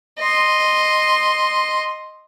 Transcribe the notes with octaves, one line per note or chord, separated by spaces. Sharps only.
D#5 C6